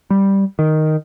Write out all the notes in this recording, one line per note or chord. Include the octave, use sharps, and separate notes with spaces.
G3
D#3